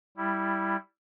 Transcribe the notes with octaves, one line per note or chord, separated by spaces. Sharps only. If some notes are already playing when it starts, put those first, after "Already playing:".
G3 E4